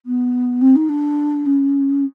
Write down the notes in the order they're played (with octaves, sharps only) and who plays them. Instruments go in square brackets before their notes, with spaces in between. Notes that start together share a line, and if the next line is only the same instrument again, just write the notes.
[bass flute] B3
C4
D#4
D4
C#4